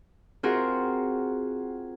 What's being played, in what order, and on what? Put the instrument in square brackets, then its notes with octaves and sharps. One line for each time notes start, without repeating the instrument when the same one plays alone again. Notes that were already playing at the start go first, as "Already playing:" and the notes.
[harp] C4 F4 F#4 G#4 A#4